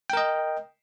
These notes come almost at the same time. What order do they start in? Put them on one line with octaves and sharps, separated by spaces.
G5 A#4 D#5